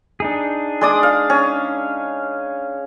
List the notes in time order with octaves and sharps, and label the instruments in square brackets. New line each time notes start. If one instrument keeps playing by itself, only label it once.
[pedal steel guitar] D4 D#4 G#4
[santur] G#3 D5 D#6
F5
C#4